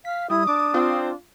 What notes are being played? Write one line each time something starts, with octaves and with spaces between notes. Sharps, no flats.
F5 B6
G3 E4 D#6
D4 D6
C4 F4